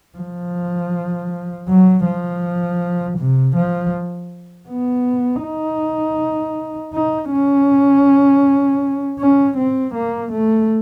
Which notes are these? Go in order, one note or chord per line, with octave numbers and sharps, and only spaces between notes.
F3
F#3
F3
C3
F3
B3
D#4
D#4
C#4
C#4
C4
A#3
A3